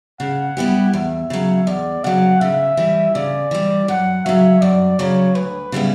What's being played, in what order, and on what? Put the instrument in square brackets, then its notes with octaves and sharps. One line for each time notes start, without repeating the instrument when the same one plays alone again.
[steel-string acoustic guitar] C#3 [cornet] F#5
[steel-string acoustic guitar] G3 B3 E4 G4
[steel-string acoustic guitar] E2 [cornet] E5
[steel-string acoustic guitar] C#3 F#3
[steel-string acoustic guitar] E2 [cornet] D5
[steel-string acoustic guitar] C#3 F#3 [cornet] F#5
[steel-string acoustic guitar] C#3 [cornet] E5
[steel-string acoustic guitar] E3 G3
[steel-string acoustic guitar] C#3 [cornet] D5
[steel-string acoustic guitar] E3 G3
[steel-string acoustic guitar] F#2 [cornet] F#5
[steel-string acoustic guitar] C#3 F#3 [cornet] E5
[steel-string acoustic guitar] F#2 [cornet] D5
[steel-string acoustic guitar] C#3 F#3 [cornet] C#5
[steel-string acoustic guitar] D2 [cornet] B4
[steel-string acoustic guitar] C#3 G3 B3 E4